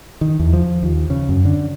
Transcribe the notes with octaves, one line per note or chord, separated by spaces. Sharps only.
D#3
E2
F3
D#2
C#3
F#2
D3